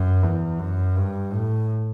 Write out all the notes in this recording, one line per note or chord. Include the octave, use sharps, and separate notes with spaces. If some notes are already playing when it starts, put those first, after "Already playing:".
Already playing: F#2
E2
F#2
G2
A2